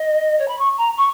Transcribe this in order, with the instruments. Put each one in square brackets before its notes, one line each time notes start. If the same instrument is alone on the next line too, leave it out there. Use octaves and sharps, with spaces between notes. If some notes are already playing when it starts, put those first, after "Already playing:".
Already playing: [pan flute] D#5
C#5
B5
C#6
A#5
C#6